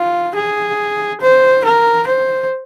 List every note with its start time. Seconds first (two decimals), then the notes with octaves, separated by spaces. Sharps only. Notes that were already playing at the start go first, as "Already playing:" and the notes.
Already playing: F4
0.36 G#4
1.22 C5
1.65 A#4
2.07 C5